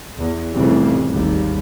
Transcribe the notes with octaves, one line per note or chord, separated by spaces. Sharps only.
E2
F1 A2 C#3 E3 G3 C4
G#1 D#2 G3